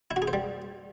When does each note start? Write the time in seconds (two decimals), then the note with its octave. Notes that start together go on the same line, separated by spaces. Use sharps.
0.11 E4
0.16 F#4
0.22 G#4
0.28 C5
0.33 G3